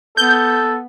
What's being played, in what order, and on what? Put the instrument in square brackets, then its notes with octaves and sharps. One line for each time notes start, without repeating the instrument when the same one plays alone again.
[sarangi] B3 [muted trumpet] A4 [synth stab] G6